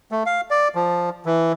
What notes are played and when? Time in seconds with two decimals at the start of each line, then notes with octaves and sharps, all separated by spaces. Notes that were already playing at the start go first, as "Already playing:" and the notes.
0.12 A3
0.26 F5
0.51 D5
0.75 F3
1.26 E3